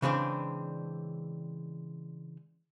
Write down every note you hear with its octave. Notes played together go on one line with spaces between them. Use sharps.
C#3 E3 G#3 C4 D4